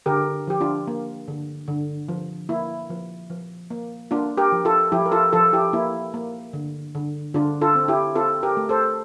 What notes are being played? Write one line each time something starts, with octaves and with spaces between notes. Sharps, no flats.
D3 G4 A#4
F3 G4
D4 F4
A#3
D3
D3
F3
A#3 E4
F3
F3
A#3
A#3 D4 F4
G4 A#4
F3
F4 A4
F3 E4 G4
A#4
F4 A4
F3 F4 A4
E4 G4
A#3 E4
A#3
D3
D3
D3 D4 F4
F4 A4
C4
E4 G4
C4 F4 A4
G4 A#4
A3
A4 C5